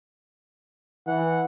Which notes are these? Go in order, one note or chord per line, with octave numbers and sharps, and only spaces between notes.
E3 F#5